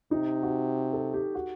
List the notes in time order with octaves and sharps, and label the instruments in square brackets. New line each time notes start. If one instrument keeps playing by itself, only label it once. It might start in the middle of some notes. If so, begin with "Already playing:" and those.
[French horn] C3 [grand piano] D#4
[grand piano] F#4
A4
G4
F#4